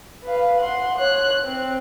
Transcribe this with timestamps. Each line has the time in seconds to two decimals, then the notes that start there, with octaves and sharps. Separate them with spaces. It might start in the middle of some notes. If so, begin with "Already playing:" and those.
0.24 B4 F5
0.58 F#5 C6
0.97 C#5 F#6
1.44 C4